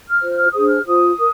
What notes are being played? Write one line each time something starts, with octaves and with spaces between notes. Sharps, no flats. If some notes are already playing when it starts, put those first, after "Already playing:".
F6
F4 C5
D4 G#4 C5 D#6
F6
F4 C5 D#6
A#4